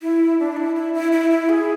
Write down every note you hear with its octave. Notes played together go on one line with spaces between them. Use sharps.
E4
D4
E4
E4
E4
E4
E4
G#4